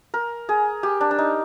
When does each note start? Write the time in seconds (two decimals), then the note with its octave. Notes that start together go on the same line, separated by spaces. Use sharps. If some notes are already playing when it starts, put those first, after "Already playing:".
0.14 A#4
0.49 G#4
0.83 G4
1.01 D4
1.11 D4
1.18 D#4